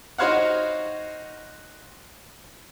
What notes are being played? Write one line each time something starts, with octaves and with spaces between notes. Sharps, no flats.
D#4 F#4 C5 C#5 F5 F#5